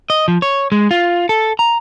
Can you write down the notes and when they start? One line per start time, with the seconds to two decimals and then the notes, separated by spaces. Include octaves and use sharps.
0.10 D#5
0.28 F3
0.42 C#5
0.72 G#3
0.91 F4
1.29 A4
1.59 A#5